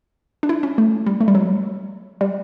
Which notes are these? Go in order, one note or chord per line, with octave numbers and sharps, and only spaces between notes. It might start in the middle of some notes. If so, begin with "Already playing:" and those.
D4
E4
C#4
A3
G3
A3
G3
F#3
G3